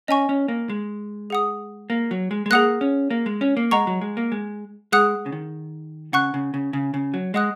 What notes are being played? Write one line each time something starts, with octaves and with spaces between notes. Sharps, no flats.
C#4 D#5 G#5 C#6
C#4
A#3
G#3
G#4 F#5 D#6
A#3
F#3
G#3
G#3
A#3 G#4 F#5 D#6 F#6
C#4
A#3
G#3
C#4
A#3
G#3 D#5 F#5 A#5 C#6
F#3
G#3
A#3
G#3
G#3 G#4 F#5 D#6 F#6
C#3
D#3
C#3 F#5 C#6 F#6
C#3
C#3
C#3
C#3
F#3
G#3 D#5 F#5 D#6 F#6